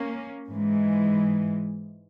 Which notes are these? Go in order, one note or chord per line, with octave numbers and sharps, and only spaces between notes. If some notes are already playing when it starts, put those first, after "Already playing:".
Already playing: A#3 C#4
G#2 E3 G#3